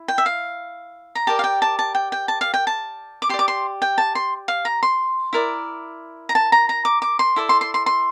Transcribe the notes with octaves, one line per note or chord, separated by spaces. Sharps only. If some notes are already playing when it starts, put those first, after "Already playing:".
Already playing: E4
G5
E5
F5
A#5
G4 A#4 D5 A5
F5
G5
A5
A5
G5
G5
A5
F5
G5
A5
D6
G4 D5 C6
D6
C6
G5
A5
C6
F5
A#5
C6
E4 A#4 D5
A#5
A5
A#5
A#5
D6
D6
C6
E4 A4 D5
C6
C6
C6
C6